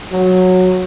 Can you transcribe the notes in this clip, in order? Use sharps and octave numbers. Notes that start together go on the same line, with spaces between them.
F#3